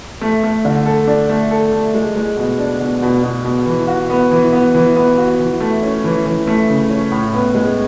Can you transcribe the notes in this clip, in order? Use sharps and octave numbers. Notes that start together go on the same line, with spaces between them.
A3
A3
D3
A4
D4
A3
A4
A3
G#3
G#3
B2
D4
B2
B2
B2
B2
E3
F#4
B3
E3
B3
E3
B3
F#4
E3
A3
C#4
E3
E3
A3
C#3
C#4
A2
B3
G#3